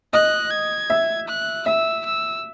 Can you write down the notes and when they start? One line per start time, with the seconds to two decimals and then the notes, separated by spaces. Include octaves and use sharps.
0.13 D#5 F#6
0.51 G#6
0.90 E5
1.28 F#6
1.66 E5 E6
2.05 E6